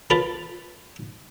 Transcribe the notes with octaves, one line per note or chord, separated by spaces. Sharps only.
F4 A#4 B4 A5 B5